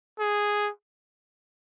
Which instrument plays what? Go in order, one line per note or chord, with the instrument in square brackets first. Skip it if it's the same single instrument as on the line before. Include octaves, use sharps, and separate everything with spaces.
[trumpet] G#4